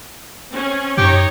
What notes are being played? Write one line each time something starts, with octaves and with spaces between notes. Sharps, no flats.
C4 C#4
F#2 D#4 G4 C#5 A#5